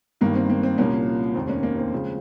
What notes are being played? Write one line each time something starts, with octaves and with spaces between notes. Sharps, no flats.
G1 G2 D#3 A#3
C4
A#3
C4
C2 A#2 F3 A#3 C#4
F1 D#2 D#3 C4
A#3 C#4
A#3 C#4
C4
C#2 C#3 F3